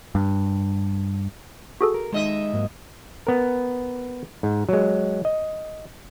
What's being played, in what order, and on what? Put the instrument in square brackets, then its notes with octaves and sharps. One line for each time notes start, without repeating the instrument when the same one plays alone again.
[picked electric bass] G2
[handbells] F#4 G#4 A4
[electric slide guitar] A#4
[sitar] D#2 D#5 E5 [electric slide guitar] G#3 D#4
[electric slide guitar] G#2 F#3 A#3
[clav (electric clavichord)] B3 A#4
G#2
F#3 G#3
D#5